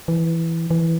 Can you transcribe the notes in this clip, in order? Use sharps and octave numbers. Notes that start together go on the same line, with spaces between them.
E3
E3